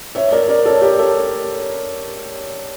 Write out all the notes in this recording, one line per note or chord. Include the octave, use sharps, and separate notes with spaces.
C#5 E5
A#4 D5
A#4 D5
A4 C#5
G4 A#4
A4 C#5